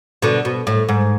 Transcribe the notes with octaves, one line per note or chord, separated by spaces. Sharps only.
B2 D3
B2
A2
G#2